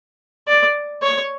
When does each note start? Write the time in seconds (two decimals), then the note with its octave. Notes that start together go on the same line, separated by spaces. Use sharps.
0.48 D5
1.03 C#5